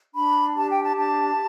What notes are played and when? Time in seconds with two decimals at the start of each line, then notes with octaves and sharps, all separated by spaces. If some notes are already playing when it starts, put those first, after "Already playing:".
0.15 D4 B5
0.55 G4 A5
0.69 G5
0.82 A5
0.96 D4 A5